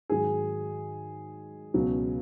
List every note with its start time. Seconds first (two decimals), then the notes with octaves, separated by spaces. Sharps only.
0.10 G#2 D#3 F#3 G#4
1.74 C#2 B2 F#3